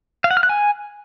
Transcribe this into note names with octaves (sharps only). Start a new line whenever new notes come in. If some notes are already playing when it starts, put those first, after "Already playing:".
F5
F#5
F6
F#6
G#5